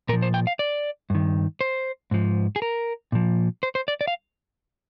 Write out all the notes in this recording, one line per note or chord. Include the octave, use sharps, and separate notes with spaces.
A#2 F3 A#4
C5
G5
F5
D5
G2 D#3
C5
G#2 F3
G#4
A#4
A#2 F3
C5
C5
D5
D5
F5